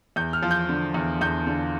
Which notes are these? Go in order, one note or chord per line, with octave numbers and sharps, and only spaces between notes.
E2 G6
F6
F3
G6
D3
E2
E2 G6
D3